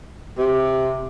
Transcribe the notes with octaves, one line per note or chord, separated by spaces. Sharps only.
C3